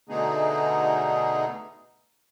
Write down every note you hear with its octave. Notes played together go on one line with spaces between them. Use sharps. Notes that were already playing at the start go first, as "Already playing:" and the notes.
B2 D3 A3 B3 D#4 G#4